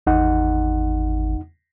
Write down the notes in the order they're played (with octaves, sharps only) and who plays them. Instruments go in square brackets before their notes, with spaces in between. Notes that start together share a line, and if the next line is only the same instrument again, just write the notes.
[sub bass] G#1 [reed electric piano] E2 D#4 F#5